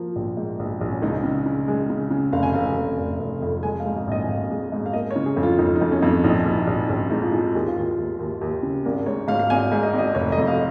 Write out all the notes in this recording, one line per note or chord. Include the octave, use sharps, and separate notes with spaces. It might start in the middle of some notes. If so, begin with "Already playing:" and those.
Already playing: F3 A#3
A#1
G#2
A#1
A#1
C#4
C#2 D#4
C#3
C#3
G#3
C#3
C#3
F1 F5
G#5
F1 F5
F1
F1
F1
F2
G#3 G#5
F5
G#2
D#5
A#1 D#5
G#5
A#1 F5
G#3
G#2
F5
A#3 D#5
C#5
C#3
G#4
F2
F4
F2 D#4
D#4
F2
C#4
F2 D#4
A#1 D#4
A#1
D#4
A#1
A#1 C#4
G#2 D#4
F4
G#3 D#4
D#2 G#4
F4
D#2 G#4
D#2
D#2
D#2
C#3
G#1 A#4
G#2 C#5
G#2 F5
F5
G#1 G#5
G#2
D#5
G#1
D#5
F1 C#5
D#5
F2
F5